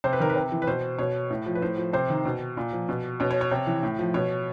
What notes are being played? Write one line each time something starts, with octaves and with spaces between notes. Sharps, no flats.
C3 C5
B4
D#3 A#4
B4
C3
E3
B4
B2 C5
B2 C#5
A2
F3
B4
A2 C5
F3
C3 C5
D#3
B2
A#2
F3
B2
B2 C#5
C#5
C#5
C3
E3
A2
F3
B2 C#5